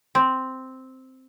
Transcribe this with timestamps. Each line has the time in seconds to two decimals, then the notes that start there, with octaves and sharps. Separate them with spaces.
0.15 C4